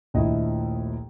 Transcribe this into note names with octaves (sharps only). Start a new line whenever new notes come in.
A#1 D#2 F3 A3 E4 D#5